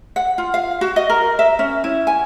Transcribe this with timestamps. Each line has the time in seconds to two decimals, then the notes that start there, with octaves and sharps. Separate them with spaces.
0.16 F#5
0.38 F4
0.54 F5
0.81 F#4
0.96 D#5
1.10 A#4
1.39 E5
1.59 C#4
1.84 E4
2.07 G#5